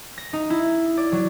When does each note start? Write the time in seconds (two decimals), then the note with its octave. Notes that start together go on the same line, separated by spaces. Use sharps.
0.18 A#6
0.33 D#4
0.50 E4
0.97 D5
1.12 F#3